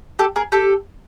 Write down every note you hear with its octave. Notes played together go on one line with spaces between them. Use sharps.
G4 A4
G#4 A#4
G4 A4